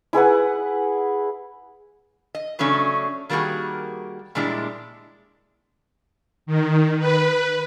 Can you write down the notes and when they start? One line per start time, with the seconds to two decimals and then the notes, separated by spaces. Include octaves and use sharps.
0.13 E4 G#4 B4 F#5
2.35 D#5
2.59 C#3 F#3 A3 C#4 D4
3.29 D#3 G3 A#3 C4 F#4 G#4
4.35 A#2 G3 G#3 D4 E4
6.46 D#3
6.99 B4